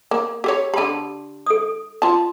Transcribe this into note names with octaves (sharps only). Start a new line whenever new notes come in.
A#3
G4 A4 C#5
D3 G4 A5 B5
A4 D#6
F4 A5